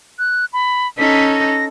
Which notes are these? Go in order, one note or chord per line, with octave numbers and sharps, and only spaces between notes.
F#6
B5
C#4 D#4 A4 B6
A#6